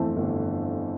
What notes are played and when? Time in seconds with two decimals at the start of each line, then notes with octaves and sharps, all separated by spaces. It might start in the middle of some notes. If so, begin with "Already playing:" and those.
Already playing: G1 F2 E3 A3 C4
0.17 G1